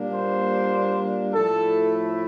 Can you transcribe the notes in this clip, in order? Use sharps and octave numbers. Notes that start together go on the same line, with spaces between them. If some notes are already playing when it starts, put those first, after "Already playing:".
Already playing: A#2 G3 A#3 D4
C5
A2 F3 A3 E4 A4